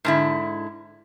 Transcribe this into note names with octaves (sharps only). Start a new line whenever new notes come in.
G#2 D3 E4